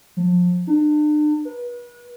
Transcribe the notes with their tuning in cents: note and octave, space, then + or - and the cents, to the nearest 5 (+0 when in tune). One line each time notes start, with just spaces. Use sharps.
F3 +30
D4 +40
B4 -35